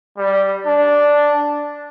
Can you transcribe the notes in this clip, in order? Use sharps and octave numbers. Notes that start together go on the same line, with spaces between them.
G3
D4